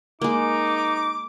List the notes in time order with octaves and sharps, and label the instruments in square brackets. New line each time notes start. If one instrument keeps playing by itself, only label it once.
[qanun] G#3 A#3 [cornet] D#4 [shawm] D6